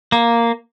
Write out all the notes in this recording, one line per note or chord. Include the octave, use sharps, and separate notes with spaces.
A#3